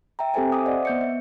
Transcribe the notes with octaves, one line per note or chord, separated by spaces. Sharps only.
E5 G5 A#5
C4 G4 A4 C5 E5 G#5
E5 D6 D#6
C5 D5 D#5 F#5
B3 G6 C#7
E5